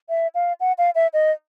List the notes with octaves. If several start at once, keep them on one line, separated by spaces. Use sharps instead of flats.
E5
F5
F#5
F5
E5
D#5